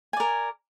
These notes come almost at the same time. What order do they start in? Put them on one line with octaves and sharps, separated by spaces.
G#5 D5 A#4